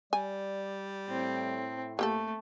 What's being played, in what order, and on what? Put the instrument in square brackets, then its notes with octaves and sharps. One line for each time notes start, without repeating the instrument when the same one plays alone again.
[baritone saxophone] G3 [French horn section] D5 [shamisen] G#5
[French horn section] A2 [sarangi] C4
[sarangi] A3 [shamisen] A#3 G4 A4